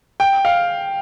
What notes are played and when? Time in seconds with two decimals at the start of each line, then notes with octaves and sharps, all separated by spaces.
0.20 G5
0.45 F5